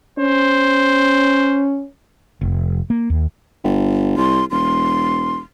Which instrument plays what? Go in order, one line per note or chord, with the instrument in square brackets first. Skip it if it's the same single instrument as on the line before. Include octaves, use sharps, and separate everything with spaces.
[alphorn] C#4 [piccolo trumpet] C5
[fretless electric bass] F1
A#3
D#2
[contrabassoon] G1
[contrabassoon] C2 [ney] C6
[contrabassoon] E1 [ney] C6